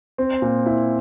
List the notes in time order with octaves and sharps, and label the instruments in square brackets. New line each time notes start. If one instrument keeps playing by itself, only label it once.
[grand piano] C4
A#2
E4